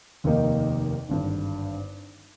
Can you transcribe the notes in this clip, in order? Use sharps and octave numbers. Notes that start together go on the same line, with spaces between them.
F1 D#2 D#3 A#3 D#4
G#1 G2 D3